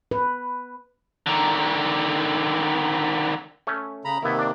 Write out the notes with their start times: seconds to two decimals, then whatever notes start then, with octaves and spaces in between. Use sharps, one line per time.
0.11 B4
1.27 D3 D#3
3.67 A3 C#4
4.05 C#3 A#5 B5
4.23 C3 D#3 A#3 B3 E4
4.39 D4 D5